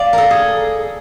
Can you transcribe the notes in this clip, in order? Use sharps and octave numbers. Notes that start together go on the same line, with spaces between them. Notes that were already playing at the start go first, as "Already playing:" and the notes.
Already playing: D5 F5
A4 A#4
G#4